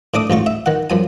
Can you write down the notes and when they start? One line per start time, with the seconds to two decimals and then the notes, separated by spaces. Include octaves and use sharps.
0.14 A2 D4 D6 D#6
0.30 A1 G#2 F4 C#6
0.46 E5
0.66 D#3 F#5
0.90 F#2 F3 G#5